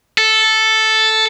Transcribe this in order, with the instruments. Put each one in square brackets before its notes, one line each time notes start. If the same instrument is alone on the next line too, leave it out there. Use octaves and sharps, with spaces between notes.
[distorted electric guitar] A4